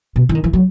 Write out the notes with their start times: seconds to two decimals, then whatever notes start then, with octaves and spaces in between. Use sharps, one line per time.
0.16 B2
0.29 E3
0.35 D#3
0.44 E3
0.53 F#3